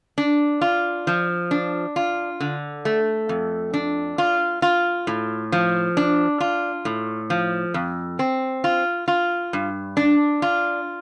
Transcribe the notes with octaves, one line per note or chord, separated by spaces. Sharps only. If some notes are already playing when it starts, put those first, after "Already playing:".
D4
F4
F3
D4
F4
D3
A3
F2
D4
F4
F4
A2
F3
D4
F4
A2
F3
F2
C4
F4
F4
G2
D4
F4